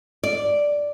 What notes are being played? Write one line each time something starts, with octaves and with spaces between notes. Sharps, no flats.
D5